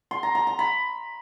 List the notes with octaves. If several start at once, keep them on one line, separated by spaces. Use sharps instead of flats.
C6
A#5
A#5
A#5
B5